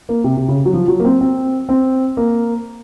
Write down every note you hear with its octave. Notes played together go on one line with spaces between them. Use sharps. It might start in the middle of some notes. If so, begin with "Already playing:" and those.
A#3
C3
C3
C#3
F#3
F3
F#3
A#3
C4
C4
C4
A#3